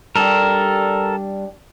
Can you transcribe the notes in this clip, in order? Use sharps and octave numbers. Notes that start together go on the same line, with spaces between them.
G3 D4 G4 A4 A#4